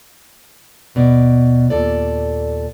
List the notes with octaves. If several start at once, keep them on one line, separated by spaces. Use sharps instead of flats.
D#2 B2 D5
D#2 A#2 A4 D5